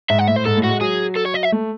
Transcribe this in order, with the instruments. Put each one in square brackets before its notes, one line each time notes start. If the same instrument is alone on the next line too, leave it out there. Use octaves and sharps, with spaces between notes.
[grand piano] G#2 [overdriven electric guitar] E5
[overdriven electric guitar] F#5
[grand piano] A2 [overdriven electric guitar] E5
[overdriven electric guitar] C5
[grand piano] G#2 [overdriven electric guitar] A4
[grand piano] A2
[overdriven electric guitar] F#4
[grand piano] G#3
[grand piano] F#3 [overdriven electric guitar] G#4
[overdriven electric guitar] A4
C#5
D#5
E5
[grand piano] A3